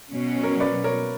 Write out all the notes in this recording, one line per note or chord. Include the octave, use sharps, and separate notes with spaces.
B2 F#3 C#4
A#4 C#5
B4 D5
A#4 C#5